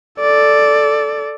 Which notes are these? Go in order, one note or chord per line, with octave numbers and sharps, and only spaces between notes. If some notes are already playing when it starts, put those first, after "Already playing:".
A4 D5